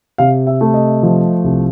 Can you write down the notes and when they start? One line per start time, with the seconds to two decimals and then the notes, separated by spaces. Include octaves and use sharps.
0.18 C3 F5
0.47 E5
0.61 A3
0.74 D#5
1.03 F3
1.44 C2